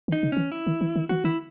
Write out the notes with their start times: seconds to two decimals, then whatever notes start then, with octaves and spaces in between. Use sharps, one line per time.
0.08 D#3
0.12 D#4
0.23 C#3
0.32 E3 C#4
0.52 E4
0.67 D#3
0.81 E3
0.96 D#3
1.09 E3 F#4
1.24 D#3 E4